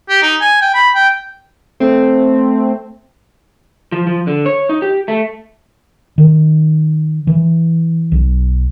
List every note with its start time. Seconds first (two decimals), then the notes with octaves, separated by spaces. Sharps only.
0.09 G4
0.22 D#4
0.41 G#5
0.62 G5
0.75 B5
0.95 G5
1.80 A3 C4
3.92 F3
4.07 F3
4.27 D3
4.46 C#5
4.69 D#4
4.82 G4
5.08 A3
6.18 D#3
7.27 E3
8.12 B1